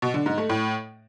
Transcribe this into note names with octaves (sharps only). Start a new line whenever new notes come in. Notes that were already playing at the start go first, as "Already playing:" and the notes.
B2
D3
G#2
A3
A2